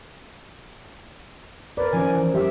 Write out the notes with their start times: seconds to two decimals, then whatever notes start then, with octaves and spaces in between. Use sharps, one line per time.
1.77 A#4 B4 D5
1.93 D#3 F3 C#4 G#5
2.11 E3
2.34 G3 G4 E5